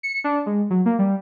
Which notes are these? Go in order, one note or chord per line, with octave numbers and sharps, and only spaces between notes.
C#7
D4
G#3
F#3
A#3
G3